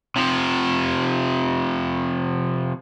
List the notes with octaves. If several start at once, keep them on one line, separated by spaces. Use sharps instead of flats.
C3 F3